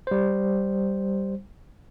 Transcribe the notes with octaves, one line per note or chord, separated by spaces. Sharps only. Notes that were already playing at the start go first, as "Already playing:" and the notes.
G3 C5